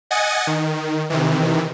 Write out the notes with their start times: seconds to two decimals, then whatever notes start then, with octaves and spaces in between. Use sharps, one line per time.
0.11 D#5 F#5 G#5 D#6 A6 C#7
0.47 D#3
1.10 C3 D#3 E3